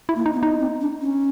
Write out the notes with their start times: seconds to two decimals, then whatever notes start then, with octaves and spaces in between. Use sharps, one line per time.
0.09 E4
0.15 A#3
0.26 D#4
0.33 C4
0.37 B3
0.43 D#4
0.59 C4
0.81 D4
1.02 C#4